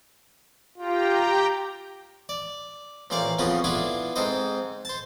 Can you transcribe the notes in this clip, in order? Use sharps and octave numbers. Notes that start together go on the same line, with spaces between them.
F4 G4 G5 A#5
D5
A1 A#2 C5 D5 F5
F2 C#3 F3 B3 F4 D#6
B3 D4 E4 F4 A4 G#5
G#2 C4 A4 C5 D#5
C5 A5